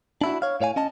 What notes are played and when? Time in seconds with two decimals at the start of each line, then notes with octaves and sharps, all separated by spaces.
0.21 D4 E4 F#4
0.42 C#5 F5
0.61 A2 C#5 F5 G#5
0.76 C#4 D#5 A5